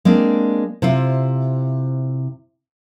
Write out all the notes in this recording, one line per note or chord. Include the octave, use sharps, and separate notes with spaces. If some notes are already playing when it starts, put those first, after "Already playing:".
G#3 A#3 C4 D4
C3 E4 F4 C5